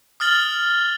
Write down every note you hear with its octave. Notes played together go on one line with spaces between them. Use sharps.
D#6 F6 A6 F#7 G7